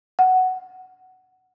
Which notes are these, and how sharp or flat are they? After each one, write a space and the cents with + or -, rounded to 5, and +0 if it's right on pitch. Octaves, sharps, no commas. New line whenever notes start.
F#5 +10